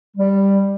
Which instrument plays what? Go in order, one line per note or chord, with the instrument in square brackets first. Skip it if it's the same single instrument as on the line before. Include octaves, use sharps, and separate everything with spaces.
[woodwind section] G3